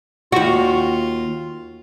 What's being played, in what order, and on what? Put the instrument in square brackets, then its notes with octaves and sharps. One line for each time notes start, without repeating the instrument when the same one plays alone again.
[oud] D#2 F#4 [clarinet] F4